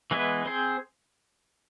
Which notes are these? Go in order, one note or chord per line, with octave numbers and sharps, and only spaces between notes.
E3 G#3 B3 E4 B4
C4 G#4 C5